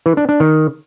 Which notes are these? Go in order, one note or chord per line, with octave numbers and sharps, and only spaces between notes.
E3
D4
D4
D#3